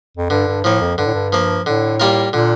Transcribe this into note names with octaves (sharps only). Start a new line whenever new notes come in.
F2
G2 D3
G2
A2 F3 A#3
F2
G2 D3
A2
G2
F3 A#3
A2 D3
G3 A#3 F4 A#4
A#2 D3